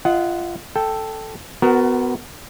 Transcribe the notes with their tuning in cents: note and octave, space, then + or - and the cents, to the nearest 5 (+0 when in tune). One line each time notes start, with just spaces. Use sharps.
F4 -20 D#5 +15 F#5 +0
A4 +0 G5 +0
B3 +25 F#4 +0 A#4 +0